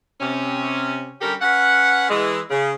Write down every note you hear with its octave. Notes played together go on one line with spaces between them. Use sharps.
C3 C#4
D3 G3 C#4 G4 A4 A#4
C#4 B4 F5 F#5
E3 G#3
C#3